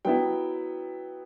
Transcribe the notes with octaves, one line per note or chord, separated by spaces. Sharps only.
F#3 B3 E4 G5